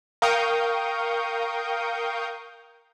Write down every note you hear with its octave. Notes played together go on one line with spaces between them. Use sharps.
A#4 F5 G5 C#6 D#6 G6